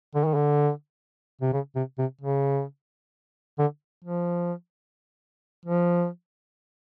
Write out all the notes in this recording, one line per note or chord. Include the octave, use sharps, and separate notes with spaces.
D3
D#3
D3
C3
C#3
C3
C3
C#3
D3
F3
F3